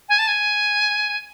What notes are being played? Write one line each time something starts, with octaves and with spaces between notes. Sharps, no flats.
G#5
A5
G#5